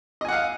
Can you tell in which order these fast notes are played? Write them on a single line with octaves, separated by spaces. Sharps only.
D#5 G#5 F#5 F5